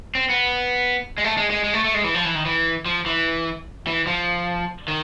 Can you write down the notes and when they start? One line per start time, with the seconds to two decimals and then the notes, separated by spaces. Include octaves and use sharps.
0.15 C4
0.30 B3
1.18 G#3
1.24 A3
1.37 G#3
1.50 G#3
1.64 G#3
1.74 A3
1.84 A3
1.94 G#3
2.04 E3
2.15 F3
2.25 E3
2.35 D#3
2.45 E3
2.86 F3
3.06 E3
3.87 E3
4.07 F3
4.88 D#3